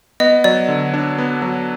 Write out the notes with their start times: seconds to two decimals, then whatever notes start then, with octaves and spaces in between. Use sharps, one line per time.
0.20 B3 D#5
0.44 F#3 D5
0.68 D3
0.94 D4
1.18 B3
1.42 F#3